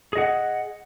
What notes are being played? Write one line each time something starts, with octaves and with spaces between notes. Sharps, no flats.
G#4 D#5 F#5